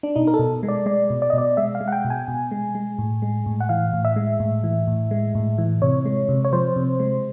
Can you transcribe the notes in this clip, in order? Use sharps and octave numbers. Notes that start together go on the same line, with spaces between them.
D4
B2 D#4
A#4
A4
B2
G#3
D5
G#3 D5
B2
D5
D#5
B2 D5
G#3 E5
F5
G#3
F#5
G5
B2
G#5
B2
G#3
G#3
A2
G#3
A2
F#5
E3 F5
A2
E5
G#3
A2
E3
A2
G#3
A2
E3
C3 C#5
G#3
C3
C#5
F3 C5
C3
G#3